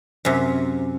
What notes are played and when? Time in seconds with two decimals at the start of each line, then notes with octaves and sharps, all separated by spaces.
0.25 F#2 C3